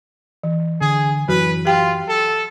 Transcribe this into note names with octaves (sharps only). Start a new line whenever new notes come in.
E3
D3 G#4
F#2 E3 F#3 F#4 B4
F4 G4 G5
A4